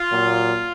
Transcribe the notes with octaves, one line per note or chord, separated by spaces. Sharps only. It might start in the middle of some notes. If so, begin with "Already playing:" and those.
Already playing: F4
A#2 F#3